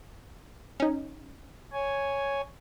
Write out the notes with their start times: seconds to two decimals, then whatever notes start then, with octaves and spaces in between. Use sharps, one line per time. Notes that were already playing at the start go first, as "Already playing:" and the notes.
0.80 C#4 D#4
1.73 C#5 G#5